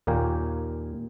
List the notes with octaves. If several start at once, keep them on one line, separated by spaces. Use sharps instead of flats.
D#2 A#2 A#3 A#4 G5 G#5